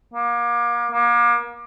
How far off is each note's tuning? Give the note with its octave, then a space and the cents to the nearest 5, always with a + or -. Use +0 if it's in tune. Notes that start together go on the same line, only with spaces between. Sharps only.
A#3 +35
A#3 +35